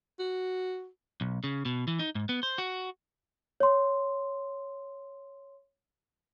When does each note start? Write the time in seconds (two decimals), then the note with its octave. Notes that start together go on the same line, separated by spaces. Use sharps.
0.20 F#4
1.21 B1
1.44 C#3
1.65 B2
1.88 E3
1.99 D#4
2.15 G#2
2.29 B3
2.43 C5
2.58 F#4
3.60 C#5 C6